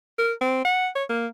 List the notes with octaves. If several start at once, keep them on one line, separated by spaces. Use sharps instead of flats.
A#4
C4
F#5
C#5
A#3